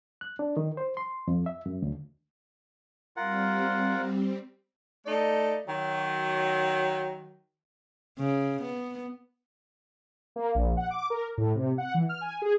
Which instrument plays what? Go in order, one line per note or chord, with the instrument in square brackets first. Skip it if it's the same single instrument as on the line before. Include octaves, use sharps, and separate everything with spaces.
[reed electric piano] F#6
D4
D#3
C5
C6
F2
E5
F#2
D2
[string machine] G3 C4 [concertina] F4 A#4 F#5
[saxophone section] A3 D#4 D5
D#3 F#3
[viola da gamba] C#3
B3
[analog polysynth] A#3
A#1
F#5
D6
A#4
A2
C3
F#5
E3
F6
G#5
G#4